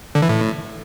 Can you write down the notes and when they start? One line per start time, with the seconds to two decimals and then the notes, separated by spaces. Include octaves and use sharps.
0.15 D3
0.22 E3
0.29 A2